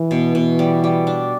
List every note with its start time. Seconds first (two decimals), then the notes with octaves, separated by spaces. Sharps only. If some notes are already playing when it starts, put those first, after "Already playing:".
Already playing: E3
0.11 B2
0.35 B2
0.59 G3
0.84 G3
1.07 D4